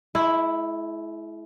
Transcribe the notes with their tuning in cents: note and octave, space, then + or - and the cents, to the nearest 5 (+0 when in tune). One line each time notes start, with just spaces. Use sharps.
G#3 +45 E4 +0